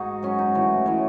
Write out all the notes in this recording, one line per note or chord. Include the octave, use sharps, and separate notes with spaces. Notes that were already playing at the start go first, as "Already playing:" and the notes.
Already playing: G#2 D#4 F#4 G#4
G#2 F#3 C#4
D#4
A2 E3 F#4
A2 E3 C#5